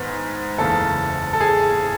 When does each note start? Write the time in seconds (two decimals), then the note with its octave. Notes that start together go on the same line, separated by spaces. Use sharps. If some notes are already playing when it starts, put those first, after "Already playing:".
Already playing: G#2 D#3 B3
0.58 F#1 E2 C#3 A4
1.33 A4
1.41 G#4